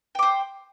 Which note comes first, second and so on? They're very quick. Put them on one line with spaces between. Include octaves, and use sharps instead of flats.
G5 D6 C5